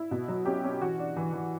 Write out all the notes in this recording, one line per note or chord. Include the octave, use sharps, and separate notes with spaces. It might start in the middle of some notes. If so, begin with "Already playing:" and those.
Already playing: E4
B2
F#3
C#4 G4
C#4
E3 F#4
D4
E3
E3